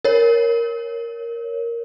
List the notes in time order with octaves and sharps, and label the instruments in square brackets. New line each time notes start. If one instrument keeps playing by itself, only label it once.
[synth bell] A#4 C#5